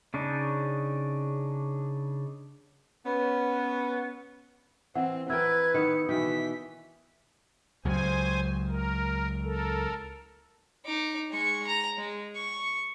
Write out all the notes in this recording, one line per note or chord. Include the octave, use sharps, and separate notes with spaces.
C#3 D4 D#4
B3 C#4
E3 C4 F#5
E3 A#4 B4 G5 E6 G#6
D#3 B3 C#7
B2 D#3 E3 G5 B6
C#2 C#3 F#3 C5 G#5
A#4
A4 A#4
D#4 D6
G#3 C#6
A#5
G#3
C#6